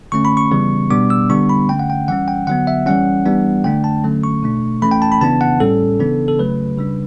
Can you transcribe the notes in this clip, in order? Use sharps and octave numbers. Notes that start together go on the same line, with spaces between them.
D3 A3 C#4 C#6
B5
C#6
C#3 E3 G3 B3
B2 G3 B3 D4 D6
E6
D3 G3 B3 D4 C#6
B5
D3 A3 C#4 G5
F#5
G5
E3 G3 C#4 F#5
G5
D3 F#3 B3 F#5
E5
E3 G3 C#4 F#5
E3 G3 B3 D4
D3 A3 D4 G5
A5
D3 F#3 A3 C#4
C#6
B2 A3 D4
E3 A3 C#4 B5
G5
A5
B5
C#3 E3 B3 D4 A5
F#5
A2 G3 C#4 A4
C#3 E3 B3 D4
A4
C#3 F#3 A3 B4
C#3 G3 D4